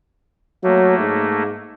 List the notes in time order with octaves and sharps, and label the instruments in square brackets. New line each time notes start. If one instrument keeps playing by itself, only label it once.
[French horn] F#3 [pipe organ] A3 A#3
[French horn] G#2